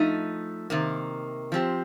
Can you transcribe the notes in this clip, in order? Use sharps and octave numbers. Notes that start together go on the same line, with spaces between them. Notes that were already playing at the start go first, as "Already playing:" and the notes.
Already playing: F3 A3 D#4
C3 D#3 A#3
F3 C4 G4